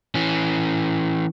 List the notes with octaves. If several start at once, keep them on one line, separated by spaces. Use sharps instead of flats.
E3 C#4